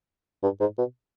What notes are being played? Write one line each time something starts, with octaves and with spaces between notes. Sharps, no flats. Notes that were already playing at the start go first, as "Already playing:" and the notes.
G2
G#2
B2